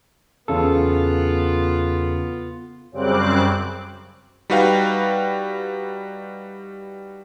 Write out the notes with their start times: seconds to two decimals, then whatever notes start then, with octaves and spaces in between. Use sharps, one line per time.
0.48 E2 C#3 B3 F4 A4
2.92 F#2 C#3 G3 C4 D6 F#6
4.50 G3 D#4 F#4 B4 F5 G5